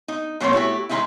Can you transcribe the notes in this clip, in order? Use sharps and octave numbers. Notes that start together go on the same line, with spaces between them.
D#4
B2 F#3 A3 A#3 C4 C#5
A3 E4 F#4 G4
D#3 E3 G#3 B3 D#4 E4